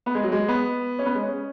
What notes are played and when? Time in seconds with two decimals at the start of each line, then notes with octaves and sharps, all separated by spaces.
0.06 B3
0.15 G#3
0.23 F#3
0.32 G#3
0.48 B3
0.99 C#4
1.06 B3
1.15 G#3
1.23 C#4